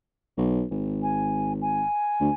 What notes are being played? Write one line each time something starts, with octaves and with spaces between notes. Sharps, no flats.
B1
G#1
G#5
G#5
D2